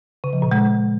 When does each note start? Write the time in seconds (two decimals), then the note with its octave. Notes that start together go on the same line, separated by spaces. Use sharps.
0.24 C#3
0.33 F3
0.42 A#2
0.51 G#3